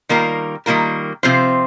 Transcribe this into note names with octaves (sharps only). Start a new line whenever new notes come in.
D#3 G3 A#3 F4 A#4
D#3 G3 A#3 F4 A#4
C3 F3 C4 F4 C5